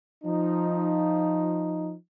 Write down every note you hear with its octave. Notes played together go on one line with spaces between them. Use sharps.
F3 D#4